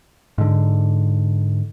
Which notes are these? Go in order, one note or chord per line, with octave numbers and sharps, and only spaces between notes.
G#2 D3